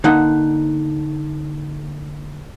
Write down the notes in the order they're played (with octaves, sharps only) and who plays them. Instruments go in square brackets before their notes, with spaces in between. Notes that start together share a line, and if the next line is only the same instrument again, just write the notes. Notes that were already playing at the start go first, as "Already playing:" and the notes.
[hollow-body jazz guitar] D3 A#3 D#4 F#5